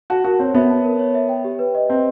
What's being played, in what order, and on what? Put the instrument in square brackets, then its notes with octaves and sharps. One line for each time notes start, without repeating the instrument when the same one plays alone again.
[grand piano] F#4 [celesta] A5
[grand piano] F#4 [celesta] A#4
[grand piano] C4 [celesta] C#5
[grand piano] B3 [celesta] E5
[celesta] A5
A#4
C#5
E5
G5
G4
B4
D#5
[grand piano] C4 [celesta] G5